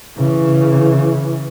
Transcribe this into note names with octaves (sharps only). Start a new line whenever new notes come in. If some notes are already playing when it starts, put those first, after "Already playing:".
C#3 E3